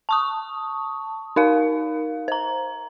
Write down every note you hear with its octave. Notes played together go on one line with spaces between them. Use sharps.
A5 C#6 D#6
D#4 A#4 F5
C5 A#5